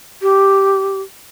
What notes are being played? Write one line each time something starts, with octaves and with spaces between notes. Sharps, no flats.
G4